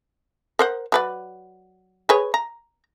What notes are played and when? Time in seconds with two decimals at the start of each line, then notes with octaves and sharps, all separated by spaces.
0.59 A#4 C5 F#5
0.92 F#3 B4 D5
2.09 G#4 B4 C#5
2.34 A#5